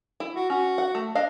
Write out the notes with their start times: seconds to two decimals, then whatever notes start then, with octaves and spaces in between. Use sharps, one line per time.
0.20 E4
0.35 F#4
0.50 C#4 F#4
0.78 F#5
0.95 A3
1.15 D4 D#5 F5